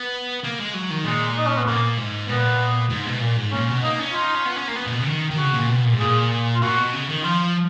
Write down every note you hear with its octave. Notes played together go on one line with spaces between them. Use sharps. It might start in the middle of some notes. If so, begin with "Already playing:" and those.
Already playing: B3
A#3
G#3
F#3
D#3
A#2 G#3
D#4
C#4
B3
A#2 A#3
G#2
A#2 B3
G#2
B2
A#2
G#2
A#2 C#4
B2
A#3 D#4
C#4
D#4 F4
C#4
B3
C#4
A#3
B3
A#2
B2
C#3
D#3
D#3
C#3 F#4
A#2
B2
A#2
G#2
A#2 G#4
F4
A#2 F#4
B2
C#3
D#3
F3 F4